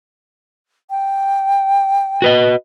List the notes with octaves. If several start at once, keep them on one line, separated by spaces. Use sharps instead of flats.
G5
F#4 B4 D#5